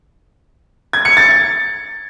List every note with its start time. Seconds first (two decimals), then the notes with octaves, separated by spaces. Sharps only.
0.93 G#6
1.05 C#7
1.17 A6